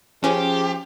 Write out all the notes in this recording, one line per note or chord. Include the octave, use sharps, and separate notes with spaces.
F3 C#4 G4 G#4